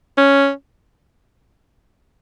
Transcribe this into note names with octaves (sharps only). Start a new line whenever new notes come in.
C#4